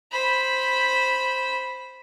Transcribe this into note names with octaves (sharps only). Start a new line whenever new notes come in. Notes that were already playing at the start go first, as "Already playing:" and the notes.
C5 B5